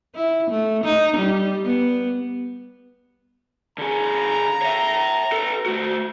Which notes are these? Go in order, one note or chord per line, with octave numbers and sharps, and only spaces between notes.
E4
A3
D#4
G3
B3
D3 G#4 A#5
C#5 E5
A4 B4
A3 F#4